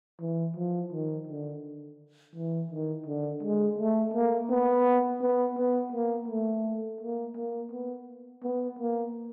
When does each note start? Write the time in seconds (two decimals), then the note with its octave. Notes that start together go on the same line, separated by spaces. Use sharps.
0.21 E3
0.57 F3
0.93 D#3
1.27 D3
2.36 E3
2.71 D#3
3.06 D3
3.43 G#3
3.79 A3
4.14 A#3
4.50 B3
5.22 B3
5.58 B3
5.92 A#3
6.28 A3
7.01 A#3
7.36 A#3
7.72 B3
8.43 B3
8.79 A#3